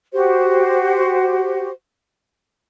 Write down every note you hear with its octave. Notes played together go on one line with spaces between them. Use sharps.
F#4 G4 C5